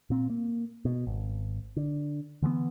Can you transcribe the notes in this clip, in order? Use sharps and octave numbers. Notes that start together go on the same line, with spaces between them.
A#2 C4
A#3
B2
G#1
D3
D3 E3 G3 B3